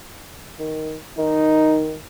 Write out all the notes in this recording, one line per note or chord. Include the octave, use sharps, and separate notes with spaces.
D#3
D#3 D#4